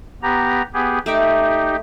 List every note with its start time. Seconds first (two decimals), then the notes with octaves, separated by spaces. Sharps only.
0.22 B3 G4 A#5
0.74 B3 G4 G#4
1.06 A3 D#4 G4 E5 D6